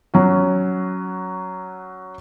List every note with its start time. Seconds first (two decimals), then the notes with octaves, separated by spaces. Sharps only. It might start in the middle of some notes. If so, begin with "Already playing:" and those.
0.14 F#3 C#4 F#4